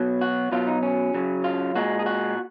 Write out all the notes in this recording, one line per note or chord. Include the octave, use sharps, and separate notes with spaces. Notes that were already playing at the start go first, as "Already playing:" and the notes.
Already playing: B2 F#3
F#4
B2 F#3 F4
D#4
C#4
C#3 F#3
F4
A#2 G#3 F#4
G#4
F#4